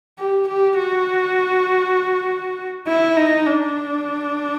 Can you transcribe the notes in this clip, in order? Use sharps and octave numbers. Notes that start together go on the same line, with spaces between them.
G4
G4
F#4
E4
D#4
D4